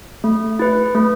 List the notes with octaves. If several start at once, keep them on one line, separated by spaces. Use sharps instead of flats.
A3
E4 B4
A3